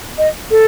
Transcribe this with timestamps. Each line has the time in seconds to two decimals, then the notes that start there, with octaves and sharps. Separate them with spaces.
0.18 D#5
0.51 A4